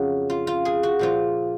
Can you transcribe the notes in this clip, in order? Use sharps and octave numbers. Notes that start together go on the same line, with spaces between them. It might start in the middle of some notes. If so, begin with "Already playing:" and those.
Already playing: F2 C#3 F#3 F#4
F4
F4
G#4
F#4
A#2 F3 F4